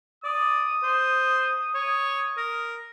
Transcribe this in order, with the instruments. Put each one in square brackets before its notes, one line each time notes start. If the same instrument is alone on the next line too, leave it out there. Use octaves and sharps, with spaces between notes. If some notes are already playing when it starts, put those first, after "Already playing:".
[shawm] D5 [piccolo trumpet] D#6
[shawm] C5
C#5
A#4